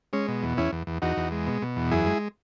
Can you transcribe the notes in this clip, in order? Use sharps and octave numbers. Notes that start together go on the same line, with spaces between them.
G#3 C#4
B2
E2
E2 C#4 E4
E2
E2
E2 D#4 F#4
E2
G#3
B2
B2
E2
F#2 E4 G#4
G#3